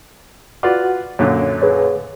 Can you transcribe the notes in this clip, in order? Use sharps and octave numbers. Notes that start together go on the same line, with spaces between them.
F4 F#4 B4 D5 F#5
F#2 A#2 D3 C#5
G#4 B4 C#5